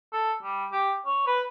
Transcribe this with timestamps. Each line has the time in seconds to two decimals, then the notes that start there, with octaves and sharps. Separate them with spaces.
0.13 A4
0.43 G3
0.72 G4
1.06 C#5
1.27 B4